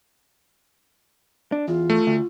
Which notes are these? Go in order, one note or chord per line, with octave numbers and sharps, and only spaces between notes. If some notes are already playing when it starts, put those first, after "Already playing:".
D4
E2 F4
A3
D2